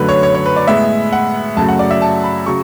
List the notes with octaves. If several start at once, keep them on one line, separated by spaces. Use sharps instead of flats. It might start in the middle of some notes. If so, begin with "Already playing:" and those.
Already playing: F#2 D3 F#3 A3 B4
C#5
C#5
C#5
B4
D5
A2 G#3 B3 E5
F#5
F#2 C#3 F#3 A3 A5
F#5
D5
E5
A5
B5
C#3 F#3 C#6